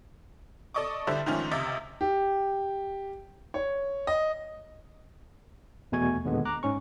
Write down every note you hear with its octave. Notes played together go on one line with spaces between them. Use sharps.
A4 D5 D#5 C#6 D6
D3 G3 D4 E4 A4 C5
G#2 D#3 F3 A3 C#4
C#2 C3 D#5 E5 D6 A6
G4
C#5
D#5
E2 B2 A3 G#5 C#6 G#6
D#2 A#2 D3 G#3 B3
A#5 D6 F#6
G#2 C#4 C#6